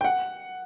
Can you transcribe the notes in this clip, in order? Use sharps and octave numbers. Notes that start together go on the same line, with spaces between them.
G5
F#5